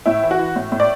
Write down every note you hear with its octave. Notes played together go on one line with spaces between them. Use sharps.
A2 E4
E3
F#4
E3
A2
A2
D5